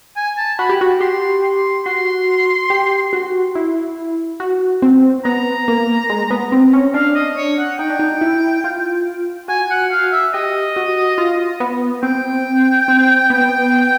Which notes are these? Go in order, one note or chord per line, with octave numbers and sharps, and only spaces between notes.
G#5
A5
F#4 B5
G4
F#4
G4 C6
C6
F#4 C6
G4
F#4
E4
F#4
C4
B3 A#5
A#3
G#3
B3
C4
C#4
D4 F5
D#5
C#5
F#5
D#4 G5
D4
D#4
E4
F4
F#4 G#5
F#5
F5
E5
G4 D#5
F#4
F4
B3
C4 G5
C4
B3